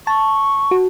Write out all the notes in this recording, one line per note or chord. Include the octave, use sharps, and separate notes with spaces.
A5 C#6
F#4